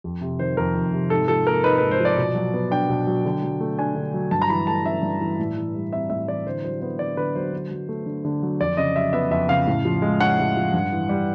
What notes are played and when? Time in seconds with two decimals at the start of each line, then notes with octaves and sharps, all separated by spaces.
0.04 F2
0.21 C3
0.39 D#3 C5
0.57 F2 A#4
0.75 F2
0.92 C3
1.10 G#2 A4
1.28 F3 A4
1.46 A#3 A#4
1.64 D#4 B4
1.78 G#2 B4
1.91 C5
2.00 F3
2.05 D5
2.17 B2
2.35 F#3
2.54 B3
2.71 D4 G5
2.89 B2
3.07 F#3
3.25 D3
3.43 F#3
3.60 A3
3.78 D4 G#5
3.96 D3
4.14 F#3
4.31 G2 A5
4.42 A#5
4.49 E3 B5
4.67 A3 A5
4.85 C#4 E5
5.03 G2
5.21 E3
5.39 A2
5.57 E3
5.74 G3
5.93 C4 E5
6.10 A2 E5
6.28 E3 D5
6.46 D3 C5
6.64 F#3 C5
6.81 B3 C5
6.99 D3 D5
7.17 D3 B4
7.35 F#3 C5
7.53 D3
7.71 F#3
7.89 A3
8.06 D3
8.25 D3
8.42 F#3
8.60 F2 D5
8.77 C#3 D#5
8.96 F#3 E5
9.13 B3 E5
9.31 F2 E5
9.49 C#3 F5
9.67 A2
9.85 F3
10.02 G#3
10.21 C#4 F#5
10.39 A2
10.57 F3
10.74 G2
10.92 E3
11.09 G3